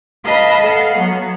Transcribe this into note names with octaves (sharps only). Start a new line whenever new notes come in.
B4 D#5 F5 A5 B5
A4 F5 F#5
F#3 B3